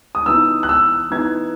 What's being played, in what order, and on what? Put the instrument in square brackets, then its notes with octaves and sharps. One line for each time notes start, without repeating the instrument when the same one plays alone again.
[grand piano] D#6
E3 B3 D#4 E6
F#6
E6
E3 B3 D#4 G#6